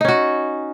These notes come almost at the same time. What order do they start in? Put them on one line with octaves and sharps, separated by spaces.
D#4 C#4 F#4